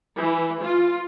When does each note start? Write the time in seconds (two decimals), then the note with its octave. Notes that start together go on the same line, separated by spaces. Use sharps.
0.18 E3
0.63 F4